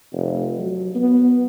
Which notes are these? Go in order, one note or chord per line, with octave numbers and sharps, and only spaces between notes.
F1
F#3
B3